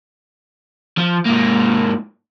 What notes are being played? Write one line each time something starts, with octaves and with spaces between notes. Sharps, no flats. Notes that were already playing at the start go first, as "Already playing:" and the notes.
F3
G#2 A#3